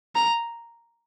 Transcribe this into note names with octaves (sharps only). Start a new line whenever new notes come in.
A#5